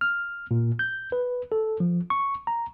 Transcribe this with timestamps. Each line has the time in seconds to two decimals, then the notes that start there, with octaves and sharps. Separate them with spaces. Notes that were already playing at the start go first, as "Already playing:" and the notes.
0.01 F6
0.51 A#2
0.79 G6
1.12 B4
1.52 A4
1.80 F3
2.10 C#6
2.47 A#5